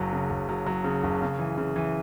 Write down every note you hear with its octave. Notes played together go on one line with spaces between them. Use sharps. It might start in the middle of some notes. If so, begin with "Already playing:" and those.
Already playing: F#1 F#3
C#3
F#1
F#3
F#3
C#3
F#1
C#3
E3
C#3
E3